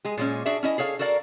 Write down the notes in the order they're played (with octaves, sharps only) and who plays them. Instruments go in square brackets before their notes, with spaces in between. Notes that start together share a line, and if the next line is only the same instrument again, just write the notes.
[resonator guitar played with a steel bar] G#3 G#4
A#2 G#3 C#4
D4 F#4 G#4 E5
C#4 E4 D#5
G#4 A4 C#5 F5
F#4 A4 A#4 D5 F5